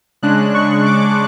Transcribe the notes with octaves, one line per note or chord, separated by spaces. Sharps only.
C#3 G#3 D4 F#6
C#6
D6